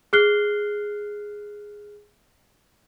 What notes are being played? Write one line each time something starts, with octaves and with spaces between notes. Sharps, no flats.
G#4 F6 F#6 C7 G7